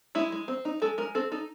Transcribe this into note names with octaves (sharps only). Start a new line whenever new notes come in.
G#3 E4
G#3
C4
D#4
G#3 A4
G#3 A#4
C4 A4
D#4 A4